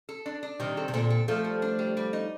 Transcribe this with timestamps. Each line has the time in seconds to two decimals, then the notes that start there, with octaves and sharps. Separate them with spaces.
0.09 A4
0.26 D4
0.43 D4
0.60 C3 D#3 G3
0.77 A4
0.88 C3
0.94 A#2 D3 A4
1.10 A4
1.28 F3 A3 A4
1.44 G3
1.62 D4
1.79 G3
1.97 G3
2.13 D#4